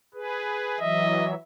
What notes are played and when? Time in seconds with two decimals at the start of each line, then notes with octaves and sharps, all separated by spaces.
0.14 G#4 B4
0.80 E3 F#3 D#5 E5